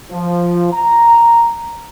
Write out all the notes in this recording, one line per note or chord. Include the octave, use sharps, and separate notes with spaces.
F3
A#5